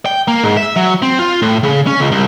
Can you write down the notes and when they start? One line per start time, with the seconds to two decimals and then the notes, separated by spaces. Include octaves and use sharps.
0.06 G5
0.28 A#3
0.44 G#2
0.57 E5
0.76 F#3
1.02 C4
1.19 F4
1.42 A2
1.63 C#3
1.87 C#4
2.00 C#2
2.12 C2